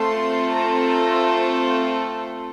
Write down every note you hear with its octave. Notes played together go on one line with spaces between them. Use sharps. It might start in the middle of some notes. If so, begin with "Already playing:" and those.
Already playing: A3 C4 F4 A4 C6
A#5
A#5